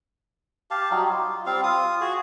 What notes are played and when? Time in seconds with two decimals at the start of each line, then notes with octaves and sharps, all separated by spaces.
0.71 G4 F5 A5
0.91 F#3 G3 D#4
1.08 F4
1.46 G3 C4 F5
1.64 F4 D#6
2.01 F#4 G#4